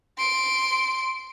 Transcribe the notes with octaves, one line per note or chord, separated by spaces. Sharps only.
C6 D7